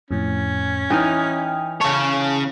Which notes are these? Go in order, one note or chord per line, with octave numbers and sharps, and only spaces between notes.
F2 A2 C#4
E3 D#4 G5 D#6 F6
C#3 C#5 A5